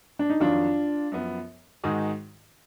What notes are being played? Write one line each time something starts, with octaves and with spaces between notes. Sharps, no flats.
D4
D#4
F2 D#3 F#3 D4 F4
F#2 F3 B3
G#2 D#3 G#3 D#4 F#4